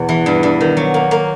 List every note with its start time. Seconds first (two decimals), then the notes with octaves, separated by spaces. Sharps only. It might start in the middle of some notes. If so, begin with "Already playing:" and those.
Already playing: E2 B2
0.09 E3
0.26 G2
0.43 G2
0.61 D#3
0.77 F#3
0.94 A#3
1.11 A#3